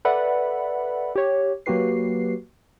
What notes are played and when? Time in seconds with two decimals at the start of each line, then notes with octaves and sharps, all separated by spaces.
0.05 A4 B4 D5 E5 F#5 B5
1.16 G4 C#5
1.66 F#3 A#3 F#4 G4 B4 C7